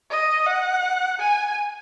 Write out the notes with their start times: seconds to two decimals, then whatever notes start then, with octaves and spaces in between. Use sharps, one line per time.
0.11 D#5
0.47 F#5
1.20 G#5